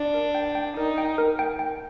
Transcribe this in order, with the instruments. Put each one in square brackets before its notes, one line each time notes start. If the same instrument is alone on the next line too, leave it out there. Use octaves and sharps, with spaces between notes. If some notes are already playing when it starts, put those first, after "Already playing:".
Already playing: [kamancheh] D4
[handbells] A#4
G5
G5
[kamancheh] D#4 [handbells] A#4
[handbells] G5
A#4
G5
G5